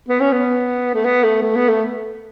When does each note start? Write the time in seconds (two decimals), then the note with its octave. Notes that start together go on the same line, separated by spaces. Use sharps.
0.09 B3
0.20 C#4
0.32 B3
0.95 A3
1.04 B3
1.23 A3
1.43 A3
1.56 B3
1.69 A3